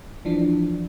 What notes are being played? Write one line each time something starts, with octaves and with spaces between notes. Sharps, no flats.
E3 F3 D4